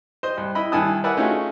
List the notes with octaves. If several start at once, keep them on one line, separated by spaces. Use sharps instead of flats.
C5 D#5
C2
E4 D#5 B5
C2 D#3 E4 G#5 A5 D#6
A#4 B4 D5 E5 F#5 G#5
A3 C#4 D#4 F4 F#4 G#4